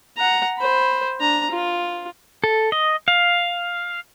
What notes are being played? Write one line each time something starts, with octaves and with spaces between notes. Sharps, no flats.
F#5 A#5
C5 B5
D4 A#5
F4
A4
D#5
F5